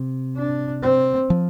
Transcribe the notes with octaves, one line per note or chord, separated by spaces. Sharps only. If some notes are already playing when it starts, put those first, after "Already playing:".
Already playing: C3
D4
C4
F3